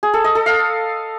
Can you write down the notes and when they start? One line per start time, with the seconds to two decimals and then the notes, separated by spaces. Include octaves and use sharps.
0.03 G#4
0.14 A4
0.24 D#5
0.35 A4
0.46 F5